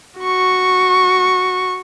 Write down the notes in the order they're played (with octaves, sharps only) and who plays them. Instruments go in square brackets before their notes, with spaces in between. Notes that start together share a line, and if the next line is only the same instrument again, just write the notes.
[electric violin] F#4 C#6